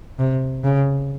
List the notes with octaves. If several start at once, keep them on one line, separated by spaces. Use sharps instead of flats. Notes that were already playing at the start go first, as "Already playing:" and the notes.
C3
C#3